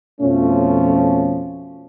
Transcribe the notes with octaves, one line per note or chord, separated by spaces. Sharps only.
F2 B2 F3 A3 C#4